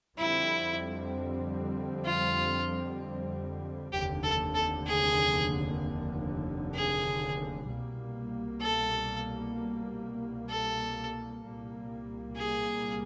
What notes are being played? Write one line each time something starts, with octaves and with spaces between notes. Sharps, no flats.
F2 D3 G3 C4 E4
F4
F1 D#2 D3 G4
A4
A4
G#4
G#4
C2 B2 G3 A#3
A4
A4
C2 A#2 G3 A#3
G#4